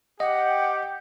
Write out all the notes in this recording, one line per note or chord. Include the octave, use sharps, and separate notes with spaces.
G4 D#5 F#5 G5